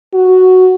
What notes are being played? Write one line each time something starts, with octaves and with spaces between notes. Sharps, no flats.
F#4